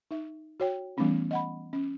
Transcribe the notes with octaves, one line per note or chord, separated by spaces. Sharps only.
D#4 E5
F#4 C#5 G5
E3 G3 A3 B3 C#4 D#4
D#5 F#5 B5
C#4